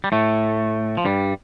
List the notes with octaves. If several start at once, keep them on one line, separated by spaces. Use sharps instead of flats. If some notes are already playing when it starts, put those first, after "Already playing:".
G3
A2 A3
F3
G2 G3